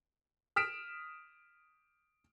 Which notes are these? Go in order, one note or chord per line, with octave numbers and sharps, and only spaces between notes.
D#6 F6 B6 D7 E7